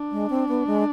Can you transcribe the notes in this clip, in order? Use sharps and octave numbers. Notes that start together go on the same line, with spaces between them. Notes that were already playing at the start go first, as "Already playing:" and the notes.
Already playing: D4
G#3
C4
B3
G#3